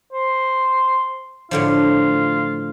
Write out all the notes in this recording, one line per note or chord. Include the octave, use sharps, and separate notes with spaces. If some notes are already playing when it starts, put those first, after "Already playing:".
C5
A2 D3 F3 F4